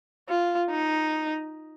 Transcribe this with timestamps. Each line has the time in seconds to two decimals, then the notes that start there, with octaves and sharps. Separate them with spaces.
0.28 F4
0.70 D#4